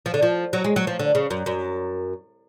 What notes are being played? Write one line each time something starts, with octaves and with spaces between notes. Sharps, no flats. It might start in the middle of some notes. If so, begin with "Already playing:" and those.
F3
D3
F3
F#3
G#3
F#3
F3
D3
C#3
F#2
F#2